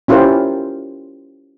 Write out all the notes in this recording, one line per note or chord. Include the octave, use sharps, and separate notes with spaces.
C#4 E4 F4 G4 A#4 C5